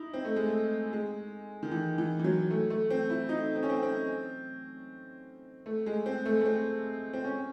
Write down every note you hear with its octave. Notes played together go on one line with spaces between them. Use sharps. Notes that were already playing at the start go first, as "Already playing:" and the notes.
Already playing: D#4 E4
C4
A3
G#3
A3
G#3
D#3
E3
E3
E3
F#3
A3
A3
C4
E4
D#4
C4
C#4
C4
C4
A3
G#3
C4
A3
A3
C4
C4
C#4